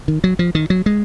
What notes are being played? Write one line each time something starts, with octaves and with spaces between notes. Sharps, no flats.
D#3
F#3
F3
D#3
F#3
G#3